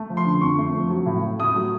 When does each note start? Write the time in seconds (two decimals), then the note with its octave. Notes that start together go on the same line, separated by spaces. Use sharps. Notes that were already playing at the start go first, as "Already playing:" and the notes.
Already playing: A3
0.10 F3
0.17 C6
0.26 D3
0.41 F2 C#6
0.59 A3
0.74 F3
0.90 F#3
1.06 A2
1.22 A2
1.39 A3 D#6
1.56 F#3